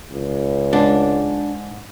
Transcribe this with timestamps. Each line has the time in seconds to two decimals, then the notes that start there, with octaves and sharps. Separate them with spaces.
0.12 C#2
0.73 G#2 D4